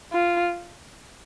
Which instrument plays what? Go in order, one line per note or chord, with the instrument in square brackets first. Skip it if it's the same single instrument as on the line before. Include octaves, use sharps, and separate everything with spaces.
[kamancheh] F4